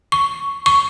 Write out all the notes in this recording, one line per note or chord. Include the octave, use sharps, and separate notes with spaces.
C#6
C#6